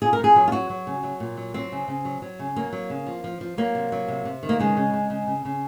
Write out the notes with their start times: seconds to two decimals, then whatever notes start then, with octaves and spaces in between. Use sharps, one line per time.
0.02 A#2 G#4
0.13 A#4
0.19 A#2
0.24 G#4
0.36 F#3
0.48 F4
0.52 F#3 F#4
0.70 F#3
0.87 C#3
1.03 F#3
1.20 A#2
1.37 F#3
1.54 F#3 C4
1.72 C#3
1.88 C#3
2.05 F#3
2.22 F#3
2.39 C#3
2.56 F#3 A#3
2.73 F#3
2.90 C#3
3.06 F3
3.24 F3
3.41 F3
3.58 F#3 A#3
3.75 C3
3.92 F#3
4.08 C3
4.25 C3
4.43 D#3
4.49 A#3
4.60 C#3 G#3
4.77 C#3
4.93 C#3
5.10 C#3
5.27 C#3
5.45 C#3